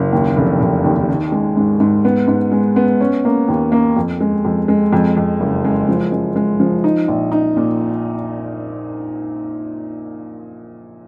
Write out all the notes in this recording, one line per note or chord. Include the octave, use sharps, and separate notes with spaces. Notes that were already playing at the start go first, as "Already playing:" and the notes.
Already playing: F#1
D#2
F1
F1
D#2
D#3
G#3
G#2
G#2
B3
G#2
G#3
B3
C#4
A#3
D#2
A#3
F2
G#3
F2
G#3
F2
F2
F#1
G#3
F3
G#3
G#3
F3
D#4
A#1
D#4
A#2